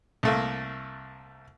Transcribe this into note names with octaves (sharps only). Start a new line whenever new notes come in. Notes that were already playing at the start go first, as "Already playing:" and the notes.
C2 A3 A#3